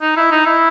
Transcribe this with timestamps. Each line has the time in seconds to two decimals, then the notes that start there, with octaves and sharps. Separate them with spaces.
0.01 D#4
0.17 E4
0.31 D#4
0.46 E4